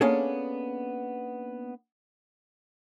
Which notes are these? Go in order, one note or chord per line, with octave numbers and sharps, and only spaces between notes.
A#3 B3 C#4 D4 G#4 A4